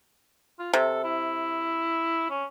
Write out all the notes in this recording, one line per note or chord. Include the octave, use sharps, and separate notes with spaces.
F4
C3 A4
E4
C#4